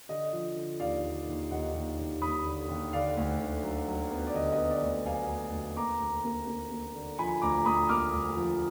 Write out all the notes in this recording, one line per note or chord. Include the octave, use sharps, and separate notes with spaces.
D3 D#5
F3
D3
D#2 D5 F5
D3
D#2
D#2 D#5 F#5
D#2
D#2
D#2 B5 D#6
D3
D#2
D3 D5 F5
D2
D3
F#3
F#3
B3
D5
D3 D#5
D#5
B3
D5
D2
F#3 F5 G#5
D2
D2
A#3 A#5 D6
D2
A#3
A#3
A#3
D3
F3 G#5 B5
D2 A#5 D6
D2 B5 D#6
A#3 D6 F6
D2
F3